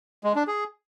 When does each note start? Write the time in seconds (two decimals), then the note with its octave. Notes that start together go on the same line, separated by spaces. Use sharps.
0.24 G#3
0.36 D4
0.48 G#4